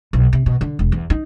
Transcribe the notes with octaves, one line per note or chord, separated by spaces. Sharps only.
B1
C3
B2
D3
E1
E2
D#4